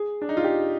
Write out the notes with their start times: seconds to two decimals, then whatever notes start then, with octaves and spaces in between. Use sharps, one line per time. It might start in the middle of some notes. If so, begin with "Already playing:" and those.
Already playing: G#4
0.22 D4
0.29 D#4
0.37 F4
0.44 G4